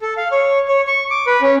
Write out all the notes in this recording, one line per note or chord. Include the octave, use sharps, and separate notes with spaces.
A4
F5
C#5
C#5
C#6
D6
B4
C#4